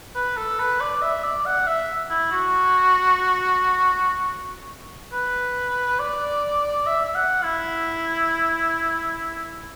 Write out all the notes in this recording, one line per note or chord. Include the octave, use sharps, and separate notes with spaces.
B4
A4
B4
D5
E5
D5
F#5
E5
E4
F#4
B4
D5
E5
E5
F#5
E4